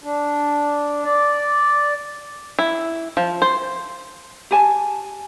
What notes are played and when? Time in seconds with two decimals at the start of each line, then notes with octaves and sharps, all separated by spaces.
0.04 D4
1.04 D5
2.59 E4
3.17 F3
3.42 C5
4.51 G4 G#5 A5